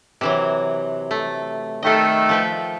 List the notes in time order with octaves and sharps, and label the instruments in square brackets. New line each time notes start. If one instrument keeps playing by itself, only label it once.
[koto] C3 E3 F#3
A3
[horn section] D#3 A3 [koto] A4 D#5
[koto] F3 B4 G5